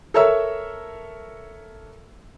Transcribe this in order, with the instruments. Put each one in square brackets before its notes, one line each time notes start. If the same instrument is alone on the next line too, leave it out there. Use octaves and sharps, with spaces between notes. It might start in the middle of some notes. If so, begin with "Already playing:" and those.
[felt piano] A4 A#4 C#5 E5 E6